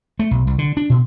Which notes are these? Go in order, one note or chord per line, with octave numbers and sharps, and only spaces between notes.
A3
B1
C2
D3
D4
B2